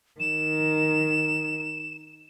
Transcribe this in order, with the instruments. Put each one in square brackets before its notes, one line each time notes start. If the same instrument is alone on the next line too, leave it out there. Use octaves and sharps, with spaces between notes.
[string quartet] D#3 [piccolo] E7